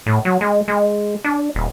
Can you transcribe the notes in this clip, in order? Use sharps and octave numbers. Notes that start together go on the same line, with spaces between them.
A2
F#3
G#3
G#3
D4
D#1